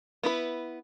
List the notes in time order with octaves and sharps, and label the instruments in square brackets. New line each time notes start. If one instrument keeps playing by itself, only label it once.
[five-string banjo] B3 E4 B4